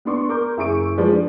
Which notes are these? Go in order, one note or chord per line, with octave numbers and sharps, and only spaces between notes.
B3 D4 C6 C#6
A#4 D6 G6
F#1 E4 G#4 C#6 D7
F3 G#3 B4 D5
D4